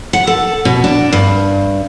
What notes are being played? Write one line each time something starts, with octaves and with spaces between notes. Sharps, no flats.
F#5
A4
B2
D4
G2